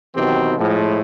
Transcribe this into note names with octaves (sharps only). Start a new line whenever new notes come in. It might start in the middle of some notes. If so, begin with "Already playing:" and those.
B2 D#3 E3 F#3 C4 G4
A2 F3 G#3